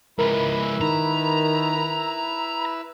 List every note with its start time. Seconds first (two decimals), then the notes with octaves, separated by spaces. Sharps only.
0.19 C#2 G#2 E4 A#4 B4 E6
0.81 D#3 A#5